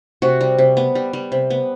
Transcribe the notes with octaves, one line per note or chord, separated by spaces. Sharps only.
C3 F#4
G3
C3
B3
G3
G3
C3
B3